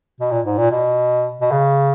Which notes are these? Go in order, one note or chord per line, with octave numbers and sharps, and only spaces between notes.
B2
A#2
G#2
A#2
B2
B2
C#3